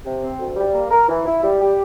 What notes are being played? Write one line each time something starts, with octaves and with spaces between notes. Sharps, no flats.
C3
C4
D2
G3
A#3
A#4
E3
E4
G3
G4